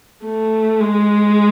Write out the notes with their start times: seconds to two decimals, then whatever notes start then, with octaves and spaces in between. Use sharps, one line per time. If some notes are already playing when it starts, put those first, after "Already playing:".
0.24 A3
0.80 G#3